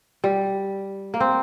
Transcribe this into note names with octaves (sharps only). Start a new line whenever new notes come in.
G3
A#3
C4